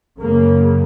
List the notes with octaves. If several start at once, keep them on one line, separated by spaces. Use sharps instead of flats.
F#2 C#3 A#3